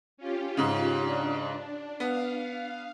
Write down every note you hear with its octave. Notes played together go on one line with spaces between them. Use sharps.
C#4 F4 G4
G#2 C#3
D4
B3 F5